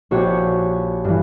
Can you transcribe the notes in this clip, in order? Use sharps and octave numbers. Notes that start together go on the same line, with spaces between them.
A#1 F#4 G4 C#5
G2 E3